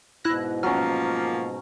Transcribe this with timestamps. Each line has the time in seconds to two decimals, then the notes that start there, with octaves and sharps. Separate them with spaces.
0.24 G#2 B2 E4 F#6 A#6
0.63 F3 F#3 A#3 C#4 F6